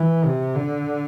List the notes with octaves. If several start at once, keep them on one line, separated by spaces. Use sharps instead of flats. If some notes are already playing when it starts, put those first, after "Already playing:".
Already playing: E3
C3
D3